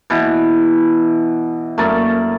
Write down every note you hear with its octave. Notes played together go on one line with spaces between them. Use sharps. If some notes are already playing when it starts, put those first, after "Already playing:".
B2 E3
F#2 A3 A#3 D5